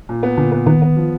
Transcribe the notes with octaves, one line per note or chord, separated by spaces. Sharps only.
A#2
B3
A#2 D3
B3
D#3 B3
B3
F3